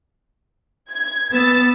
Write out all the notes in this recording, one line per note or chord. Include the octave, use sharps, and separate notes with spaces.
G#6
B3 E6 A6